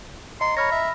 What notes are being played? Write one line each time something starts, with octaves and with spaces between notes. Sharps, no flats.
D#5 A#5 C6 C#7
C#5 B5 F6 A#6
E5